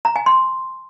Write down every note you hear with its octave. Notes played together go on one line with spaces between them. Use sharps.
A#5
G#5
C6